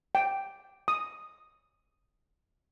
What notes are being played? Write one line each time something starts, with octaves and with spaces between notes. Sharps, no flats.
G5
D#6